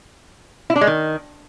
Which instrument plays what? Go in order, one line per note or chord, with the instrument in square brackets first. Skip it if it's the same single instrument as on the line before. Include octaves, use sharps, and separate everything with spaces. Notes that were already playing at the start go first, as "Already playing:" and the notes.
[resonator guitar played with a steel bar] E4
D4
G#3
D#3